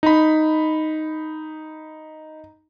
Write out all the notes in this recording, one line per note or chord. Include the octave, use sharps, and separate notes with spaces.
D#4 B5